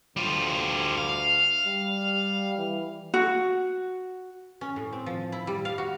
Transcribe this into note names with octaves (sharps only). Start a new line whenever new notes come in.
D2 G3 F4
F5
G3
E3
F#4
C#4
A2
C4
F3
E4
G3
F5
F#4